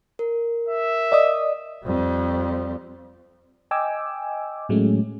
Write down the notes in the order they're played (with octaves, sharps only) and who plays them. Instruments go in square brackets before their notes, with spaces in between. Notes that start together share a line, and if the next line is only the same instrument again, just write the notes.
[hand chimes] A#4
[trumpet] E5
[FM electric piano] D5 D#5 D#6
[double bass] F2 G3
[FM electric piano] D#5 G5 G#5 D6 E6
A2 F#3 G#3 A3 C#4